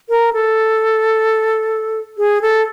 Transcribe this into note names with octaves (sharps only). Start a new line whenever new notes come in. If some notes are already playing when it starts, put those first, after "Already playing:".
A#4
A4
G#4
A4